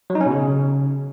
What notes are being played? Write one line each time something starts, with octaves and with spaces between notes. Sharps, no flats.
F#3
D#4
C#4
B2
C#3